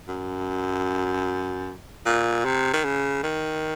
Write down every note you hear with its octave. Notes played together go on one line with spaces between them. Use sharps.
F#2
A#2
C3
D#3
C#3
D#3